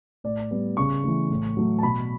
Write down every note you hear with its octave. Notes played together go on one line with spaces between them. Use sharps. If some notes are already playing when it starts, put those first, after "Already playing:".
A2 D5
G3 B3
C#3 C#6
E3 A3
A2
F#3 A3
A5
B2 B5